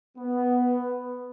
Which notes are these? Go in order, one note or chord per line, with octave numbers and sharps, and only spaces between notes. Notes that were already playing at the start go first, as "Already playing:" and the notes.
B3